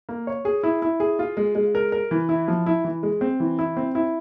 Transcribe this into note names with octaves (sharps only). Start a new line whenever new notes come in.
A#3
C#5
G#4
E4
E4
G#4
F4
G#3
G#3
A#4
A#4
E3
E4
F3
E4
E3
G#3
C4
E3
E4
C4
E4